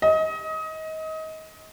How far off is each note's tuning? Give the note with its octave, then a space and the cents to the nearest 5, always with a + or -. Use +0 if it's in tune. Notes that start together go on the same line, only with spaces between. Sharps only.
D#5 +25